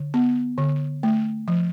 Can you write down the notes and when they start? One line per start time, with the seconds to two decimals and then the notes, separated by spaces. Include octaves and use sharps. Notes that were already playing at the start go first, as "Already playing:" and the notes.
Already playing: D3
0.14 B3
0.58 D3
1.03 A3
1.48 F3